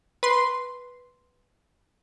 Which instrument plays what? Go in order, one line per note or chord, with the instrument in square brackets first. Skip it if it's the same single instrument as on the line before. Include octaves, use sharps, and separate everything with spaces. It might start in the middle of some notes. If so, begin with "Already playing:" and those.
[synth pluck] B4 C6